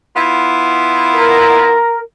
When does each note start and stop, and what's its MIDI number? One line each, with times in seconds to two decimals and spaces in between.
0.16 1.78 59
0.16 1.78 64
0.16 1.78 65
1.13 1.98 70